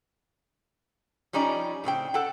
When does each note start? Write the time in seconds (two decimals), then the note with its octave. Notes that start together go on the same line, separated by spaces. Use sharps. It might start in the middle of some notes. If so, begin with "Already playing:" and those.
1.33 F3 G3 C#4 D#4 D5
1.84 A2 C#3 C4 G5
2.14 A4 F#5 G5